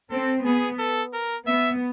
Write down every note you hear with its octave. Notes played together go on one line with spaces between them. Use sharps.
C4 A4
B3 G#4
A4
A#4
B3 E5